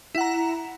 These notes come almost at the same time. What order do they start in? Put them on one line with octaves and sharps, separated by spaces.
E4 F#5 A#5